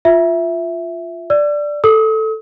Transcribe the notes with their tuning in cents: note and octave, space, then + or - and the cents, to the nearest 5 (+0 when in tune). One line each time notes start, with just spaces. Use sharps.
F4 +0 E5 +0
D5 +0 E6 +40
A4 +0 D#6 +45